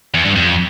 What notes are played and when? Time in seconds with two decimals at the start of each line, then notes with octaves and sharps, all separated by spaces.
0.14 E2
0.25 G2
0.36 F2